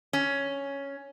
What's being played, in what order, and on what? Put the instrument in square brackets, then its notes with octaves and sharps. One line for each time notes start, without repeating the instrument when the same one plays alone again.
[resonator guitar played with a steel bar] C#4